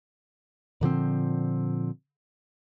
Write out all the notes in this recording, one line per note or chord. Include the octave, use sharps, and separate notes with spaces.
A#2 D3 F3 C4